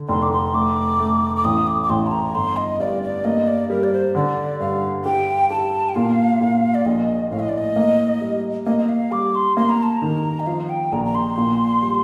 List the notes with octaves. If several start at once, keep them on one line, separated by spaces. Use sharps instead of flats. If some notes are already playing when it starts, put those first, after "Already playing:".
Already playing: D3
F1 C6
D6
C6
A3 D6
A3
D6
A1 D#6
D6
D6
A1 C6
A5
A#5
G1 C6
D#5
G2 D5
D5
A#3 D#5
D5
G3 A#4
D5
C5
D3 D5
G2 F5
G4 G5
G4 A5
G5
A#2 F5
A#2
D5
A#1 D#5
A2 F5
D#5
D5
D#5
A#3
G3
A#3 D#5
D#5
F5
G3 D6
C6
A#3 C6
A#5
A5
A#5
D#3
D#5
F3 F5
G5
A#1 A#5
A#5
C6
A#2
G3